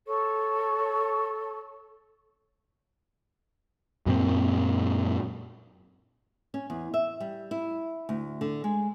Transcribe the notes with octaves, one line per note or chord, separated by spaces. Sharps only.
A4 C#5 C#6
F#2 A#2 C4
C#4
E2
E5
G3
E4
D2
D3
G#3